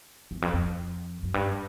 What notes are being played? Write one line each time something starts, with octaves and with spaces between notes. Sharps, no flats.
E2
F2
F2
F#2
G2